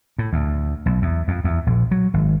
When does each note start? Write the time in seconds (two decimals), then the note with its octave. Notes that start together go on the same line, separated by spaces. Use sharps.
0.18 A2
0.33 D2
0.86 B1
1.02 E2
1.28 F2
1.44 E2
1.67 A#1
1.91 F#3
2.14 G#1